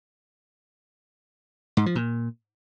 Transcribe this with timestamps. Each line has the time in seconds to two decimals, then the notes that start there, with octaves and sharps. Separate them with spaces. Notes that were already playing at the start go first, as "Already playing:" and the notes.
1.77 G#2
1.86 F3
1.96 A#2